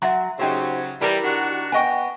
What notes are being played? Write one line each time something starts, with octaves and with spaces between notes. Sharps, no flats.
F#3 E5 F#5 C6
C#3 F#3 D#4 G4 C5
E3 G3 E4 G4 A#4
D#3 D4 F#4
B3 D#5 G5 G#5 C#6